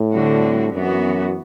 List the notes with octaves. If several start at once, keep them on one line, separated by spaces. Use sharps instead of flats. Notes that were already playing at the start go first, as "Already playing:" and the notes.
Already playing: A2
D3 G3 C4 F#4
F#2 E3 B3 F#4